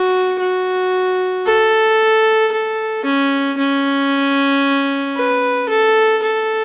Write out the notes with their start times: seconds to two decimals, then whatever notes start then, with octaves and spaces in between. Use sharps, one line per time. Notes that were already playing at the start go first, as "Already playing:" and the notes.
Already playing: F#4
0.40 F#4
1.46 A4
2.52 A4
3.05 C#4
3.58 C#4
5.17 B4
5.69 A4
6.22 A4